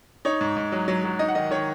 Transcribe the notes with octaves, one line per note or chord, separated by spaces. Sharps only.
D#4 C#5
G#2
G#2
F#3
F#3
F#3
D#4 D#5
F#5
D#3 D#5
D#3 C#5